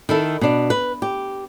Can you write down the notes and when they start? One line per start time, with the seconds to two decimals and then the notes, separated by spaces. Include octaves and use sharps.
0.09 D#3 E4 A4
0.41 B2 D4
0.70 B4
1.02 G4